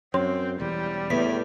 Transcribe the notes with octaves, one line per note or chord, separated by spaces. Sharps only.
F#2 C4 C#5 C6
E1 E2 G3
E2 A2 B6